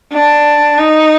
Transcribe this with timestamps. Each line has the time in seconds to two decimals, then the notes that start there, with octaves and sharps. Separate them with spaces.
0.13 D4
0.78 D#4